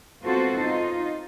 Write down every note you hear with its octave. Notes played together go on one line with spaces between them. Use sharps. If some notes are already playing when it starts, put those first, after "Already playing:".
B3 C4 F4 F#4 A4 C5
D#4 F4